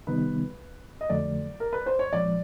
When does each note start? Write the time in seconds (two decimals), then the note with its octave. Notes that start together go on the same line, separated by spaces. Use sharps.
0.07 C3 D#3 G3 B3 D#4 B4
1.01 D#5
1.10 F2 D3 F#3 A3 D5
1.60 A#4
1.73 B4
1.86 C5
1.99 C#5
2.12 A#2 F3 G#3 C4 D5